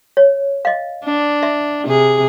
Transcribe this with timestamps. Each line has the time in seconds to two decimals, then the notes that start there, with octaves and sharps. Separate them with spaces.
0.17 C#5
0.65 D#5 F5
1.04 D4
1.43 E5
1.86 C3 G#4